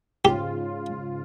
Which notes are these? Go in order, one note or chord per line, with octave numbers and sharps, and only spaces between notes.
G#2 C#3 F4 G4